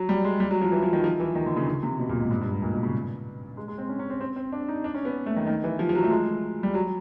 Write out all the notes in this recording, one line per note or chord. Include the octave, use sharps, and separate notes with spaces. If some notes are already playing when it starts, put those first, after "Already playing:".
Already playing: F#3
G3
G#3
G3
F#3
F3
E3
F3
D#3
F3
E3
D#3
D3
C#3
C#3
C3
B2
A#2
G#2
G2
G2
G#2
A#2
B2
C#3
G#3
G#3
C4
C#4
C#4
C4
C4
C4
D4
D#4
D4
C#4
B3
A3
D#3
D#3
E3
F3
F3
F#3
A3
G#3
G3
F#3